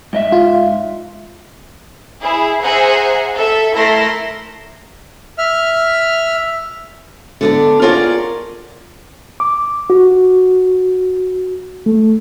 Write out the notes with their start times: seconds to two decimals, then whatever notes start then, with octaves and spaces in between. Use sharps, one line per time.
0.13 G#2 D#5 E5
0.32 F4
2.22 E4 G#4
2.62 G#4 C5 E5 F#5 G#5 A#5
3.35 A4 E5
3.75 A3 E4 A4 A#4 C6 A#6
5.38 E5 F6
7.41 D3 B3 D4
7.82 F4 G#4 A#4 C#5 D5 F#5
9.40 D6
9.90 F#4
11.86 A3